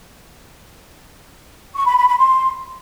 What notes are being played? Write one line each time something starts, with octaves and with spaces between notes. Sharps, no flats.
C#6
B5
B5
B5
C6